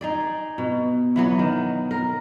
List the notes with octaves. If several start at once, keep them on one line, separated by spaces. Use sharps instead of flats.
D#4 G#4 D5
B2
E3 F#3 B3
D#3
A#4